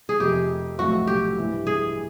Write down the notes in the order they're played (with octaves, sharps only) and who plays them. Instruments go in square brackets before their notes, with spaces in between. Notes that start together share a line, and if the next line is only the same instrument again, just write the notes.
[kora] G#4
[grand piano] F1 F2 C3 [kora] G4
[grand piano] B1 A2 F3 A3 C4 [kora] F#4
[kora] G4
[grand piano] G2 E3 G3
[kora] G#4